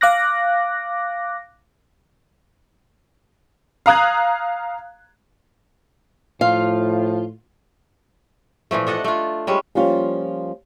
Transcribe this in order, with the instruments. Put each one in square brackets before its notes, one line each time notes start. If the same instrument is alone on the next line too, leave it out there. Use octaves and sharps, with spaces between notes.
[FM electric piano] F5 D6 F#6 A#6
[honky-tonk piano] F5 A#5 D#6 F#6 G#6
[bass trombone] A2 [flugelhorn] F3 [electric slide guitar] F4 [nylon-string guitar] F5
[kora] A#2 E3 F3 A3
D4 A4 D#5 F#5
A3 F4
G3 G#3 C#4
[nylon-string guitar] F3 G3 A#3 C#4 F4